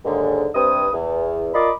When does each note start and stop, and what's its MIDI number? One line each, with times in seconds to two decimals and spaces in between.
0.05 0.47 39
0.05 0.47 44
0.05 0.47 50
0.55 0.87 43
0.55 0.87 48
0.55 0.87 60
0.55 0.87 71
0.55 0.87 87
0.93 1.48 40
1.54 1.71 65
1.54 1.71 70
1.54 1.71 74
1.54 1.71 75
1.54 1.71 83
1.54 1.71 86